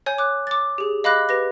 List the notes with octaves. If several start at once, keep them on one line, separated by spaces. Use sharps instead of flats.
C#5 G#5 G6
D6 F#6
D6 A6
G4 G#4
D#5 F5 B5 D6 F#6 A#6
G4 B4 A#6